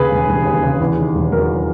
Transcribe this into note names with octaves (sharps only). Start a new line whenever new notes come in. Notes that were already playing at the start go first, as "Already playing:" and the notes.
Already playing: D#2 C#3 G#4 B4
E1
E1
D#2
C#3
E2
D#3
E1
F#3 A#4